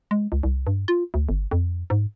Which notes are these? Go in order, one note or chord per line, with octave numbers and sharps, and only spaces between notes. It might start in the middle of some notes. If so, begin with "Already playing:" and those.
G#3
C#2
C2
G2
F4
D2
G1
F2
G#2